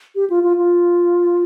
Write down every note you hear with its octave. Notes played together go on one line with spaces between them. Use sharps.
G4
F4
F4
F4